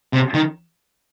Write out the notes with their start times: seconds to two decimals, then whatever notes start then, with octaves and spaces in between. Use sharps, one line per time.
0.13 C3
0.34 D#3